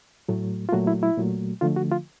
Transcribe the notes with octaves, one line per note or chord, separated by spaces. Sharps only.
A2 F#3 A3
F4
A#2 F#3 A3 F#4
E4
E4
A#2 F#3 A3
D3 F3 A3 F4
F#4
F4